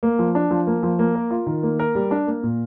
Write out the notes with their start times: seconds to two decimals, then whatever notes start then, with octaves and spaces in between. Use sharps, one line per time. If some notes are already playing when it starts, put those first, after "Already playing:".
0.03 A#3
0.19 F3
0.35 D4
0.51 F3
0.67 A#3
0.83 F3
0.99 A#3
1.15 A#4
1.30 F4
1.47 D#3
1.63 A#3
1.79 A#4
1.95 G3
2.11 D4
2.27 A#3
2.43 A#2